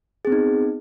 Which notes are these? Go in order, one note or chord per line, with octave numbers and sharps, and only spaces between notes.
B3 C4 D#4 G#4